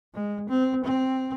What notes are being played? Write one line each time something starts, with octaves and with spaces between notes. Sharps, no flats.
G#3
C4
C4